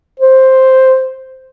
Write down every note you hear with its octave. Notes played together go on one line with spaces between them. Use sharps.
C5